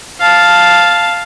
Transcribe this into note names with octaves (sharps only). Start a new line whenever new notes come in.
F5 A5